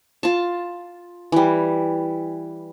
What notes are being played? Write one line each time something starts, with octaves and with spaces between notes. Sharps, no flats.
F4 A5
E3 G3